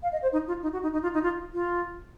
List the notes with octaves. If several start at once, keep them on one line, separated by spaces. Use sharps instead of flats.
F5
D#5
C5
D#4
F4
D#4
F#4
D#4
D#4
F4
D#4
F4
F4